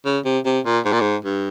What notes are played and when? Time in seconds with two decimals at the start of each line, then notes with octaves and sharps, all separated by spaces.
0.05 C#3
0.25 C3
0.46 C3
0.66 A#2
0.85 G#2
0.93 A#2
1.01 G#2
1.25 G2